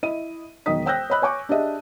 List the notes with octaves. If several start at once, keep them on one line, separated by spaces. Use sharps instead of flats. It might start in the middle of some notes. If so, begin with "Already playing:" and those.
E4 D#5 D#7
E1 B1 D#3 D#5 D#6 B6
C5 G5 E6 F#6 G6 A#6
C#5 D#5 B5 F#6
C#5 G#5 C#6 D6
D4 G4 G#4 D#5 E5